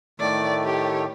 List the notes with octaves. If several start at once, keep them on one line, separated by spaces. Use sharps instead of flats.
A2 D#3 A3 D5
G4 C#5